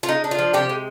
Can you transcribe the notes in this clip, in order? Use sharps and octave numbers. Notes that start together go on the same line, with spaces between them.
F4
G#3 D#4
D4
F4
F3
C3 G4
G#3